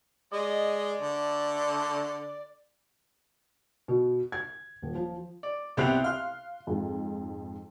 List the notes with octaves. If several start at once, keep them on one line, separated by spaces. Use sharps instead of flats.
G#3 D5 D#5
D3 A3
B2
G#6
D#1
F3
D5
C2 B3 C4 G4 F#6 F7
F5 C6 F6
F2 G#2